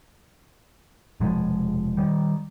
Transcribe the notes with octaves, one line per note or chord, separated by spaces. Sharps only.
F1 B2 F3 G#3
D#3 G3